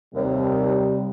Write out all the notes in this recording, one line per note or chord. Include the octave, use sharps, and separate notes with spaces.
D#2 C3 G3